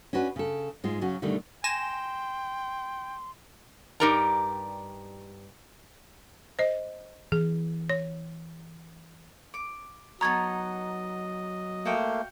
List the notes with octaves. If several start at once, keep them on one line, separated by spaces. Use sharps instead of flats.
C#4 D4 F#4 B4
C#3 A4
G#2 G#3 F4
C#3 F#3 C#4 F#4
B2 D3 D#3 G3 A3
G5 G#5 C6 A#6 E7
G2 D#4 G4 A#4 D5 A#5
C5 D#5
E3 G#4
C#5
D6
F#3 B3 D#4 D#5 A5 A#5 C#6 G#6
A3 A#3 F#4 F5 G5